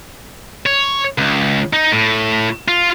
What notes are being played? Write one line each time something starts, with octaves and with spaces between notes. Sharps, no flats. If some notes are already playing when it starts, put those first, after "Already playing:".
C#5
C#2
D#4
A2
F4